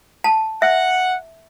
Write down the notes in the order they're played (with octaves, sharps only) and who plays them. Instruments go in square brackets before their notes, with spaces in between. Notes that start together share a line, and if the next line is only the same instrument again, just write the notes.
[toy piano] A5
[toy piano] E5 [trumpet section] F#5